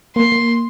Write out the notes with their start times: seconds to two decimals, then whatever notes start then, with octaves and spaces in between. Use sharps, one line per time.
0.16 A#3 C6
0.32 A#3